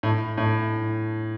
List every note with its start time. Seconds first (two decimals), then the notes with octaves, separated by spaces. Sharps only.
0.03 A2
0.38 A2